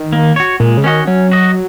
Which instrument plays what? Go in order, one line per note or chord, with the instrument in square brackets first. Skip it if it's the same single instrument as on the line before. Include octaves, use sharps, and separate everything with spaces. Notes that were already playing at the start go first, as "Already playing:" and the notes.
Already playing: [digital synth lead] D#3
[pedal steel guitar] A#3
F#4 C#5
[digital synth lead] A#2 [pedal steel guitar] G#3
[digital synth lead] C#3
[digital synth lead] D#3 [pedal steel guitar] C#4 F#4 D#5
[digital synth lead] F#3 [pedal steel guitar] C#4
[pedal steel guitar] F#4 D#5